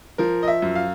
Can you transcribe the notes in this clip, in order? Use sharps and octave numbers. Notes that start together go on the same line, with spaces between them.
F3 A#4
D#5
E5
F#2
F5